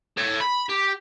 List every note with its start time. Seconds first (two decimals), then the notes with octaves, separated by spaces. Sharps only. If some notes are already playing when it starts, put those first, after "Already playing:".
0.17 A4 C#5
0.41 B5
0.69 G4